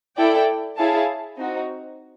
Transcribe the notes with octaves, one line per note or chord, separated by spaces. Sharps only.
E4 A4 D5 G5
E4 G#4 C#5 F5 A5
C4 D#4 F#4